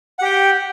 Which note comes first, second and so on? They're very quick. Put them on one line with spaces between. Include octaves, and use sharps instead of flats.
F#5 G4 G5